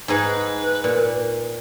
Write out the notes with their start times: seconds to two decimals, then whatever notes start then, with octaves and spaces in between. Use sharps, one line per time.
0.08 G#2 D#4 G#4 B4
0.84 A#2